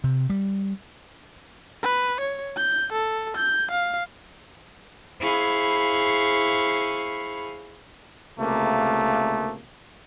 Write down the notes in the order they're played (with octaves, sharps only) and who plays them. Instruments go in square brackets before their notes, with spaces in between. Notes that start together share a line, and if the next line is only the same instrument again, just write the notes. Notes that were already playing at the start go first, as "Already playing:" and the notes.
[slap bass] C3
G3
[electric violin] B4
C#5
G6
A4
G6
F5
[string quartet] E4 G#4 C5 F5 B5 C#6
[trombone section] C#2 C3 A#3 [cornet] A3